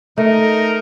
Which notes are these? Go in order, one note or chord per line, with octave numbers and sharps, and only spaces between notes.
A3 D#4 A#4